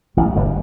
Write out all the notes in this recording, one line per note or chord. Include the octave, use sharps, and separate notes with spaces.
A1 F#2 A2 D3 G3
G1 G2